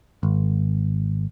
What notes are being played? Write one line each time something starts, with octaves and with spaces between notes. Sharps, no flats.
G#1